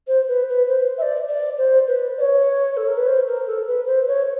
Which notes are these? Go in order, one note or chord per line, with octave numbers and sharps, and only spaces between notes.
C5
B4
B4
C5
E5
D5
D5
C5
B4
D5
C#5
A4
A#4
B4
C5
A#4
A4
B4
C5
C#5